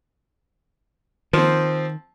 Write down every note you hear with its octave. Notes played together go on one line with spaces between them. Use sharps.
D#3 F3 C4